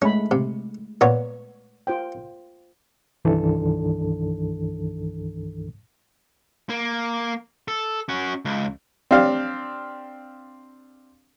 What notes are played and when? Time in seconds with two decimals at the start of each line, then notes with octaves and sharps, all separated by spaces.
0.02 G#3 A3 C#4 B5
0.31 C3
1.01 A#2 B3 C#5
1.87 F4 C5 G5
3.25 C2 G2 D#3 E3 D4 A4
6.70 A#3
7.68 A4
8.09 C#4 F#4
8.45 C#2
9.11 C4 D4 G4 F5